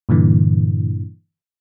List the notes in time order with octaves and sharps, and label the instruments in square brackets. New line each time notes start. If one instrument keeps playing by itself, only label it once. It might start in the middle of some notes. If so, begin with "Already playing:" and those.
[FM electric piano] G2 A#2 D3 E3